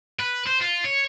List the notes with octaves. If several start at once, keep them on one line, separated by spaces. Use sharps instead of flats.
B4
C5
F4
C#5